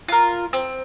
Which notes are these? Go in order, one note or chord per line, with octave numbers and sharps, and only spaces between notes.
F4 A#4
C4